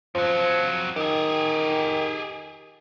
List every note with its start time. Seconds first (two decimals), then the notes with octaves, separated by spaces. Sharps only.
0.15 F2 F3 F#3
0.96 D#3 G4 G#4